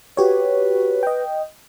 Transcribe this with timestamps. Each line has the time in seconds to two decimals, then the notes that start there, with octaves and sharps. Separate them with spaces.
0.17 F#4 G4 B4 C#5
1.03 D#5 G5